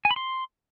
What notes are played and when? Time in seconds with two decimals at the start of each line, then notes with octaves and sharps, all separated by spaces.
0.05 G#5
0.11 B5
0.16 C6